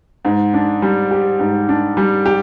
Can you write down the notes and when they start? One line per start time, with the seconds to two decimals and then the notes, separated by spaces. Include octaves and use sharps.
0.25 G#2
0.54 D4
0.82 G3
1.11 G4
1.39 G#2
1.69 D4
1.97 G3
2.26 G4